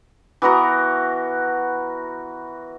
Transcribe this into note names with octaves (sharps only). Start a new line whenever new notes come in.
E3 B3 F#4 A#4